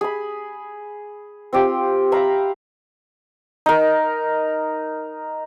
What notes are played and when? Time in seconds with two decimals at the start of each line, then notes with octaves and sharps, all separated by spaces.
0.01 G#4 B5
1.53 C4 F4 G4
2.12 E5 F5 A#5 B5
3.66 D#4 A#4